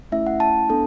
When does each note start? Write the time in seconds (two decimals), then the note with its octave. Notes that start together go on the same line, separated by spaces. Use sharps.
0.12 A3 C#4 E4 E5
0.27 F#5
0.40 A5
0.69 B3 D4 A4